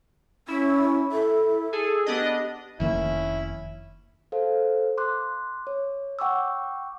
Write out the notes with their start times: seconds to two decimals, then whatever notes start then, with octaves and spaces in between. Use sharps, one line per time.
0.48 C#4 E4
1.12 A4
1.73 G#4 A4
2.06 B3 D4 G4 D#5
2.80 F1 D#3 A#3 C#4 E4
4.32 A4 C5 F5
4.98 C6 D6 F#6
5.67 C#5
6.19 F#5 G5 C#6 D6 E6